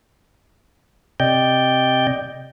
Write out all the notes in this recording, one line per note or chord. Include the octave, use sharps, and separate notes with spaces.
C3 D5 D#5 G5 G6